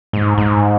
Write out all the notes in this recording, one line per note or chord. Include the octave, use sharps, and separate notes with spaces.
G#2
G#2